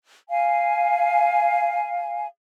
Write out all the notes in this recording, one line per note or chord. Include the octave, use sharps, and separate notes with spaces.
F5 G#5